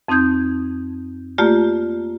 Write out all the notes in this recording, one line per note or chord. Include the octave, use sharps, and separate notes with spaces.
F2 C4 D#4 D#6 G6 G#6
A3 A#3 F4 G4 D5